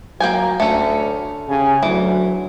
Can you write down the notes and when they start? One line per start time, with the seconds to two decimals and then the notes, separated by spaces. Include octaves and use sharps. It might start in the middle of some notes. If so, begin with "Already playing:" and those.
0.20 F#3 A#3 G5 G#5
0.60 D2 A3 C#4
1.49 C#3 G4 G#5
1.83 D2 E3 F#3